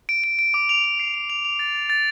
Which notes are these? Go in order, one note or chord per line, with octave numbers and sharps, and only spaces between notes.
D7
D7
D7
D6
F7
F7
C7
F7
F7
F7
A6
A6
A6